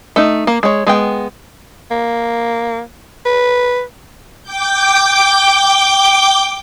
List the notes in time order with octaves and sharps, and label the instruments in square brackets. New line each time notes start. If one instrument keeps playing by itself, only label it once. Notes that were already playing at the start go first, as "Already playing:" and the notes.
[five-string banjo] A3 D#4
A#3
G#3 C#5
G#3 B3 G5
[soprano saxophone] A#3
B4
[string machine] G5 D6 G6